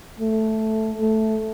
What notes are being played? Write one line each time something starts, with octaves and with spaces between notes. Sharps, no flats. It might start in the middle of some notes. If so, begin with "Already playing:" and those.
A3
A3